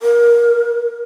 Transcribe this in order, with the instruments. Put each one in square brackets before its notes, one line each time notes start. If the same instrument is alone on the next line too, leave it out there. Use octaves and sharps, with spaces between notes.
[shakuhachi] A#4